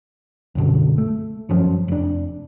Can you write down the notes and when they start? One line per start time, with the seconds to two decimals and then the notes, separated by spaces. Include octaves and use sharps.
0.55 C2 F#2 B2 D3
0.98 A3
1.49 G1 F#2 F3 C#4
1.88 F1 D4